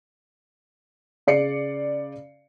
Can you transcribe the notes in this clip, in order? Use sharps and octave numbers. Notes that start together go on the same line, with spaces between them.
C#3 D5 C7 C#7